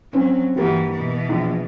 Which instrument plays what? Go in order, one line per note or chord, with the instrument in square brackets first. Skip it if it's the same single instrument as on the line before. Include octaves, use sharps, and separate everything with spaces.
[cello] F#3 [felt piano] C4 C#4
[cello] G2 E3 [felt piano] G3 A#3 F#4
[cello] B2 E3
[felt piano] A#1